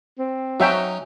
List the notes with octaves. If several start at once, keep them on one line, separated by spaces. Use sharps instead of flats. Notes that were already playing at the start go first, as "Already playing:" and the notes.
C4
F#3 C#4 D#4 F#4 E5 G5